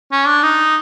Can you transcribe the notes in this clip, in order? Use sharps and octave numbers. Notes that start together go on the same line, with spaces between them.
C#4
D4
D#4